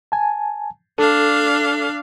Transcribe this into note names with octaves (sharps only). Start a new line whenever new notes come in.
G#5 A5
D4 A4 F5